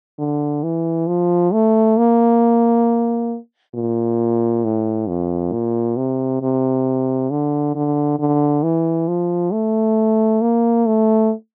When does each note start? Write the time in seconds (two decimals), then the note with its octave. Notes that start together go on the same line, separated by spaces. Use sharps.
0.19 D3
0.63 E3
1.07 F3
1.53 A3
1.97 A#3
3.74 A#2
4.64 A2
5.09 F2
5.52 A#2
5.97 C3
6.42 C3
7.30 D3
7.75 D3
8.19 D3
8.63 E3
9.08 F3
9.53 A3
10.41 A#3
10.86 A3